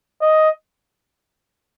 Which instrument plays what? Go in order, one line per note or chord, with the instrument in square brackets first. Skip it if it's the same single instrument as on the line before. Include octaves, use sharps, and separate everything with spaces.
[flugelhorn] D#5